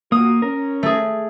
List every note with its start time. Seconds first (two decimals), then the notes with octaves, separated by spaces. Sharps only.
0.12 A#2 A#3 F#4 D#6
0.42 C#4 A#4
0.83 A3 G#4